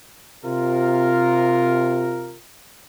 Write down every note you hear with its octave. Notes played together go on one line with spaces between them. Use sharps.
C3 F4 A#4